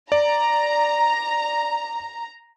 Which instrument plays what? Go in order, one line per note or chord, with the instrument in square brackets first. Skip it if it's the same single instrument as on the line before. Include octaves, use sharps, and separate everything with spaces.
[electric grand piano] D5 [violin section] A#5